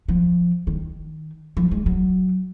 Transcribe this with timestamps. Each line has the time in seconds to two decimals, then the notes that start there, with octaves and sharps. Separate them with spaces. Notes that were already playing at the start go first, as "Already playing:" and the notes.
0.08 F3
0.67 D#3
1.57 F3
1.71 G#3
1.86 F#3